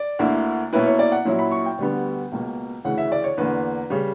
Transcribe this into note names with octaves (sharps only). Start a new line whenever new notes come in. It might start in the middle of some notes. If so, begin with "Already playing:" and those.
Already playing: D5
D2 D3 A#3 E4
B2 A#3 C#4 E4 B4
C#5
D5
F#5
A#2 F#3 C#4 E4
B5
C#6
G5
D2 D3 G3 B3
C#2 B2 A#3
D2 C#3 E3 F#5
E5
D5
C#5
E2 D3 A#3 B4
C#3 G3